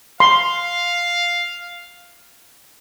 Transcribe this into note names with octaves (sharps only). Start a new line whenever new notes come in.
F5 C6